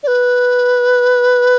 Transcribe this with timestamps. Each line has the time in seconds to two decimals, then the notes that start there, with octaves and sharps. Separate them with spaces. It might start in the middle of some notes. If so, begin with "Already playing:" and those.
0.03 D5
0.07 B4